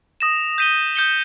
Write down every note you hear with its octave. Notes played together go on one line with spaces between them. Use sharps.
D#6 A#6 E7
G6 B6 D#7 G7
D#6 G6 C#7 G7